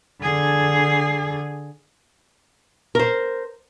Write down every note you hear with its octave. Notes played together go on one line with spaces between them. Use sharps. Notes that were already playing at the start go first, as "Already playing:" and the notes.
D3 G#4
A#4 C5